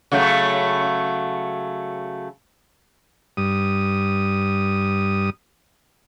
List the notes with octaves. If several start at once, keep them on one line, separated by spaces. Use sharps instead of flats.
C#3 F#3 A3
G2 D#6